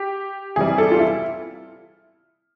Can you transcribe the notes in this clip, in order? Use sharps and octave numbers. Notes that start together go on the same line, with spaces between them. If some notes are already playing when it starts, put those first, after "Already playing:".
Already playing: G4
C3 E3 G3 G#4
A4
F4
E4